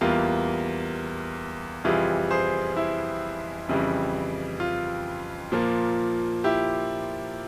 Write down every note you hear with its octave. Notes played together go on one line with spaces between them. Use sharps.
E2 E3 G3 A#3 F4
F2 C3 E3 G3 F4 G#4
G#4 C5
E4
F2 C#3 E3 G3
F4
A#2 F3 A#3
E4 G4